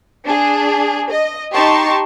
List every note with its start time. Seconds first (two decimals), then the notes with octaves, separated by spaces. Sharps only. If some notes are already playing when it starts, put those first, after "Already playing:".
0.25 D4 G#4
1.10 D#5
1.53 D#4 G4 A5 C6 C#6